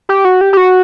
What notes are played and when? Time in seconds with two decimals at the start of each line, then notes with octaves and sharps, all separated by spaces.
0.09 G4
0.25 F#4
0.41 G4
0.53 G4
0.57 F#4